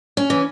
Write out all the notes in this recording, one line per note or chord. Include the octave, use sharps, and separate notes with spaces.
C#4
E3